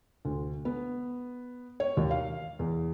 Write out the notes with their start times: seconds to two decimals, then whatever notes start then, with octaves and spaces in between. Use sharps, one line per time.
0.25 D2
0.65 B3
1.80 C#5
1.97 D#2
2.11 F5
2.59 E2